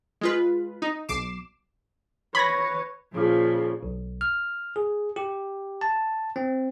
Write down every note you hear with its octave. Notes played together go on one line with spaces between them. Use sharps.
G#3 F4 B4
D#4
B1 D6 C7 E7
B4 C#5 B5 G#6 A#6
A#2 C#3 F3
B1
F6
G#4
G4
A5
C4